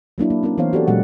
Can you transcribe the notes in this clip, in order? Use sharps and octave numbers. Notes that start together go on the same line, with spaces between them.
F#3 A#3 D4 E4
A#3
C4 C#4 E4 A#4
E3 B3 C5 C#5 F5
F#4 G4 A4 D5
A#2 F#3 G#3 G4 F#5